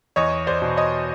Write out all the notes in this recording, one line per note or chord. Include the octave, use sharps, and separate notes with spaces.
E2 C#5 D#5
C5 D5
B2
C#5 D#5